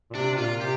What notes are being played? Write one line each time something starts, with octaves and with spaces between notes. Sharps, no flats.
A#2
C3 D4
C3
A#2 F4
C3 G4